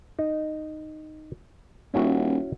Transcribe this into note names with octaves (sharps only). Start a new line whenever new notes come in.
D#4
D#1 C#4 E4 F#4